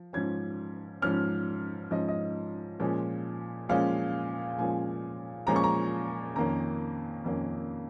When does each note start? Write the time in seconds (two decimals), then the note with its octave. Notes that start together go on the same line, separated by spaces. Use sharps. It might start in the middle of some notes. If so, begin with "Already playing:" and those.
Already playing: F3
0.13 G#2 F3 C#4 G#6
1.02 G#2 F3 C#4 F6
1.91 G#2 F3 C#4 D#5
2.08 D#5
2.80 A#2 F3 G#3 C#4
3.69 A#2 F3 G#3 C#4 F5
4.58 A#2 F3 G#3 C#4 G#5
5.47 A#2 F3 G#3 C#4 A#5
5.56 C#6
5.64 A#5
6.36 F2 D#3 A#3 C#4 A#5
7.24 F2 D#3 A#3 C#4